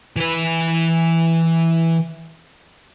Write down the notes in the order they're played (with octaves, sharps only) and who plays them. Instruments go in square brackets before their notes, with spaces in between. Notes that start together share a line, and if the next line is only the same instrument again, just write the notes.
[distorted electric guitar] E3 B4